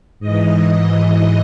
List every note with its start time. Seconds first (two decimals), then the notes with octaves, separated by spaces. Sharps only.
0.20 G#2 E3 D#5